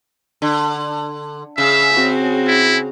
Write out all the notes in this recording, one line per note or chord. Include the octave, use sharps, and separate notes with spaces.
D3
C#3 E5 F5 E6
C4 F#4
E4